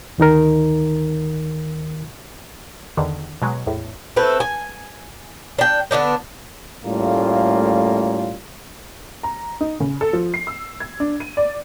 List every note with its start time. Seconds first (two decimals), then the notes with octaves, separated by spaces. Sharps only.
0.18 D2 D#3 D#4 A#4
2.97 E2 D3 D#3
3.42 B2 F#3 G#3
3.67 E2 A2
4.16 A3 C4 E4 B4
4.40 G#5
5.59 D4 G5
5.91 D3 B3 D4 D#4
6.84 A2 G3 A3 A#3 C#4 F4
9.23 A#5
9.61 D#4
9.80 C#3
10.01 A4
10.13 F3
10.34 C7
10.47 E6
10.80 G#6
11.00 D4
11.20 D#7
11.37 D5